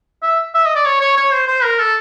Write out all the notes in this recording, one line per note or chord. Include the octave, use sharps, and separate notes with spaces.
E5
E5
D#5
D5
C#5
C#5
C#5
C5
C5
A#4
A4